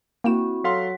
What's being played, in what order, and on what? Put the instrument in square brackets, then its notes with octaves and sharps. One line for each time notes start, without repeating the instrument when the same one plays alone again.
[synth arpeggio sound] A#3 G5 E7 [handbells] C4 E4 F#4
[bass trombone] F#3 [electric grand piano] A4 F5 C6 [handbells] F#5 B6